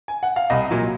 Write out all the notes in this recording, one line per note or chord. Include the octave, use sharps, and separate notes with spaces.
G#5
F#5
F5
C2 D#5
A#2 F#3